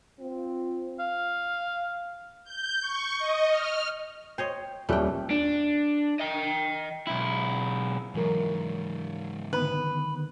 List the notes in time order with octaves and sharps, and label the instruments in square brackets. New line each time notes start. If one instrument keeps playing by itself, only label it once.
[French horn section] C4 F4
[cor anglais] F5
[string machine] G6
C#6
D#5
F6
[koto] C5 C#5 D#5 [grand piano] G5
[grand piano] D#1 G3 F#6 [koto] A3 G5
[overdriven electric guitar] D4
D#5 G5
B1 E4
[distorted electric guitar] G#2 C#3 [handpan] E3 F#3 A#4
[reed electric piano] D3 D#3 B3 [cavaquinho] B4